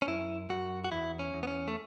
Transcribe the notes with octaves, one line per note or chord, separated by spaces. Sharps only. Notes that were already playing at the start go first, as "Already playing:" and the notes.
C#4
F#2 E4
F#2 F#4
F#4
E2 E4
C#4
E2
B3
C#4
A3